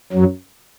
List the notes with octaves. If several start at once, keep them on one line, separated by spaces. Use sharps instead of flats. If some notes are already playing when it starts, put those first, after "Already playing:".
F#2 F#3